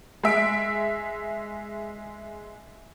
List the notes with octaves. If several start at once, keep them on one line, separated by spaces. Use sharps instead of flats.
G#3 E5 D7